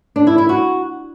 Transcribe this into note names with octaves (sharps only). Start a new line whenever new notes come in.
D4
E4
E4
F#4